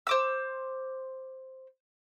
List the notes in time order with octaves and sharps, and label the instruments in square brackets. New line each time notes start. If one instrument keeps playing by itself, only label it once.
[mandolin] C5 D6 E6